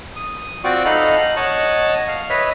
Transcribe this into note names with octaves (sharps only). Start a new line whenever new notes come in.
D#6
C4 F4 F#4 D5 G5 C#6
D#4 A4 D#5 F5 F#5 B5
C#5 D#5 F#5 A5 C#6
F5
B4 C#5 D#5 E5